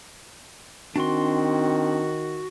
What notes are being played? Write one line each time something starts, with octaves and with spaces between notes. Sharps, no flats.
D#3 C4 D4 F#4 C6